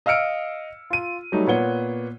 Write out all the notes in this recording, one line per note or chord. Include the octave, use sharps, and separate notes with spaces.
D#5 F5 E6 F6 C#7 D7
F4 D#7
F#3 G3 A3 D#4
A#2 B3 C#5 F#5 G7